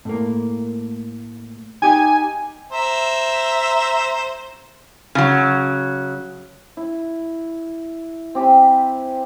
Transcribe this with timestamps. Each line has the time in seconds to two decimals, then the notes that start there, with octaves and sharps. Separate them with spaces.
0.05 A2 A#3
1.82 D#4 G4 G#5
2.72 C5 E5 A#5
5.15 C#3 F#3
6.77 E4
8.35 C4 G4 G#5 B5